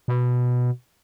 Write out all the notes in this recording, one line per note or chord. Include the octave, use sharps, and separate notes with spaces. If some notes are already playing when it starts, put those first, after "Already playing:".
B2